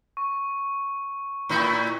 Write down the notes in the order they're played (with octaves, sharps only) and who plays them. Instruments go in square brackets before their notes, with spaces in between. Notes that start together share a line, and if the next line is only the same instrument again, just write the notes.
[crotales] C#6
[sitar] A2 D#4 E4